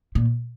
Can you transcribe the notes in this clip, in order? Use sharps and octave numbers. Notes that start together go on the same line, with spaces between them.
A#2